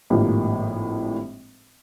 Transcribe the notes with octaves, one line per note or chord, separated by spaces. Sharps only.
G#1 A2 F3 A#3 D4 G4